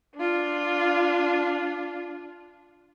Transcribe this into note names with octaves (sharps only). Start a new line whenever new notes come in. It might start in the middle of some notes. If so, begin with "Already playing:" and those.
D4 F4